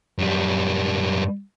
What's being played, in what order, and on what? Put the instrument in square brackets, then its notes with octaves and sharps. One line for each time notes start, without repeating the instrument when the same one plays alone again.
[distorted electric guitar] F#2 G3